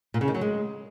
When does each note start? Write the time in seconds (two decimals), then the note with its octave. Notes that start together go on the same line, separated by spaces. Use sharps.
0.14 A#2
0.21 C#3
0.28 D#3
0.34 F#3
0.41 G#3